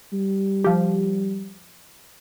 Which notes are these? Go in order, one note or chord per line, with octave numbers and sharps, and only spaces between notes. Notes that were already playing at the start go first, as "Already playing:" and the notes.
G3
F3 G4